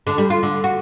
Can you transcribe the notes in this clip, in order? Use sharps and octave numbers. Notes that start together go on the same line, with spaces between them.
D3 D4
G3
F4
D3
F#4